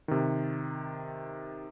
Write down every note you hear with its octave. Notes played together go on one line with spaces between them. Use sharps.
C3 D#3